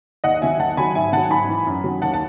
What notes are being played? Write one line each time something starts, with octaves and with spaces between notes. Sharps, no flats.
D#2 D#5 F#5
D#3 F#3 E5 G#5
D#2 F#5 A5
D#3 F#3 G#5 B5
G#2 E5 G#5
D#3 F#3 F#5 A5
G#2 G#5 B5
E3
F#2
D#3 F#3
D#2 F#5 A5
A5